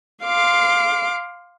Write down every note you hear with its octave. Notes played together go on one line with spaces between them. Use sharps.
F5 C6 D6